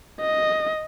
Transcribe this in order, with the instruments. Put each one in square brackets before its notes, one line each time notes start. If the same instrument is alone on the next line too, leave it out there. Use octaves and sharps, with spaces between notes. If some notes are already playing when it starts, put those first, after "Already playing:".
[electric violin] D#5